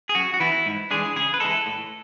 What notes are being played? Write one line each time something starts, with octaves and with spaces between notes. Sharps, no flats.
G#4
F#2 F#4
F#4
E3 B3 E4
G#2
E3 G#3 D4 G#4
C#3 G#4
B4
E3 G#3 A4
A2